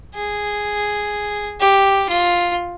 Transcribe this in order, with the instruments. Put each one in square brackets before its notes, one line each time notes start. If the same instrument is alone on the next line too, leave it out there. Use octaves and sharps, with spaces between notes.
[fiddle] G#4
G4
F4